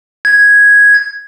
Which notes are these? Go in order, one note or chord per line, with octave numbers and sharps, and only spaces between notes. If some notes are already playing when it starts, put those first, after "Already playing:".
G#6